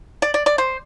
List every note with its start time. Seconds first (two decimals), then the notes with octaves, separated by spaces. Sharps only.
0.22 D5
0.34 D5
0.46 D5
0.58 C5